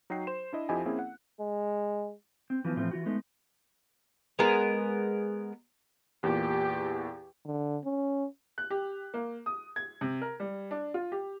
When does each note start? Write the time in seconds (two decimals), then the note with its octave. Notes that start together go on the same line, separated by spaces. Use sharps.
0.10 F#3 D#4 F#4 G5 C7
0.27 C5 C6 E7
0.53 D4 E4 D#5
0.69 F2 F3 E4 G4 D#5 G#5
0.86 A#3 C4 C#4 E4 G#4
0.99 F#5
1.40 G#3
2.50 C4
2.65 E3 F3 B3
2.76 A2 E3 F3 A3 C4
2.91 E3 F4 F#4
3.06 G#3 A3 B3 D#4
4.39 G#3 B3 A#4
6.23 E2 A#2 G4
7.46 D3
7.85 C#4
8.58 F#6
8.70 G4
9.14 A#3
9.46 D#6
9.76 G#6
10.01 C3
10.22 A#4
10.40 G3
10.71 D4
10.94 F4
11.12 G4